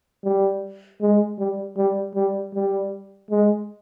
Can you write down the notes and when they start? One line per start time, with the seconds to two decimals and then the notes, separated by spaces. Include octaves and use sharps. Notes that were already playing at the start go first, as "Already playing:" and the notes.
0.24 G3
1.01 G#3
1.39 G3
1.77 G3
2.15 G3
2.54 G3
3.31 G#3